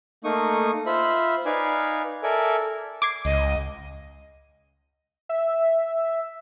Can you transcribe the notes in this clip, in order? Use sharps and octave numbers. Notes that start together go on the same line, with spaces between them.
A3 A#3 D#4 C#6 D#6
F4 C5 E5 B5
D#4 B4 D5 F5 G#5
A4 A#4 D5 E5 G#5
D6 G#6 C7
C#2 D#5
E5